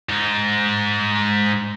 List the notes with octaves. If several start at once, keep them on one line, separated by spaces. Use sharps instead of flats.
G#2 D#4